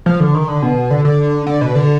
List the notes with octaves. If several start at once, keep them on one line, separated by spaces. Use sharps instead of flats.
F3
D3
D#3
D3
B2
D3
D3
D3
B2
D3